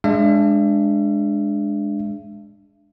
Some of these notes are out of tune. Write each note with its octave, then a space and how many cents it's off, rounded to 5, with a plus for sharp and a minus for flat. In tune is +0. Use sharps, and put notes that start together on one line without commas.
G#3 +0 D4 +0 E5 +35